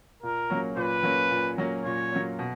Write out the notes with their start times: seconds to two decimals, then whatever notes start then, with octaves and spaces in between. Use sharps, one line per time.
0.23 A#2 A#4
0.50 F#3 A#3 C#4
0.76 A#2 B4
1.03 F#3 A#3 C#4
1.31 A#2
1.58 F#3 A#3 C#4
1.85 A#2 C#5
2.13 F#3 A#3 C#4
2.39 B2